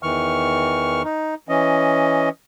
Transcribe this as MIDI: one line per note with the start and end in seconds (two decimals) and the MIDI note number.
0.03 1.02 40
0.03 1.02 51
0.03 1.02 52
0.03 1.02 85
0.03 1.02 89
1.04 1.35 63
1.49 2.29 52
1.49 2.29 61
1.49 2.29 75